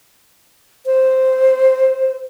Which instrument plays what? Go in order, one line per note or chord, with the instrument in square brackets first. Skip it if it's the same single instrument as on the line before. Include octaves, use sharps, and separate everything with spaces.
[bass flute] C5